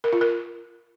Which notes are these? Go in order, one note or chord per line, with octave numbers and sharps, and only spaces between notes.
A#4
F4
A#4